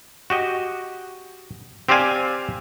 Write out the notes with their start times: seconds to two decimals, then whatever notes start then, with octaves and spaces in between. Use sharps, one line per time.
0.30 F#4 G4 D#5
1.89 C4 G4 C5 D5 F5 G#5